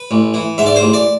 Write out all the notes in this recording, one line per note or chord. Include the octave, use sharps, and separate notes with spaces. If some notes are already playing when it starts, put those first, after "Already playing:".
Already playing: B4
A1
E3
G#2 E5
D5
C5
A1
D5